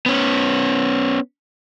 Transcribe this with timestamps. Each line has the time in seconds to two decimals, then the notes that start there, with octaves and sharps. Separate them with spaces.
0.06 B3 C#4